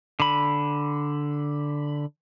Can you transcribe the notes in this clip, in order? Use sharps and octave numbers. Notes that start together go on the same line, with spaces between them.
D3 B5